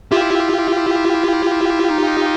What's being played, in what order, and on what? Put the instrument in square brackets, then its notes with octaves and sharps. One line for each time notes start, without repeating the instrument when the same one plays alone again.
[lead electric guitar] E4 [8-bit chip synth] F4 G4
[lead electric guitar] D#4